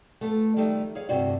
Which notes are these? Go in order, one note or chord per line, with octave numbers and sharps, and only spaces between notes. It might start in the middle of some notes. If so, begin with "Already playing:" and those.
A3 B3 F4 A4
D#3 F3 G3 A3 D#4
G#4 C#5 F5
D2 G2 C3 E4 F#4 D5